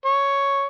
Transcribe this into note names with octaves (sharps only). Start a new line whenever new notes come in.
C#5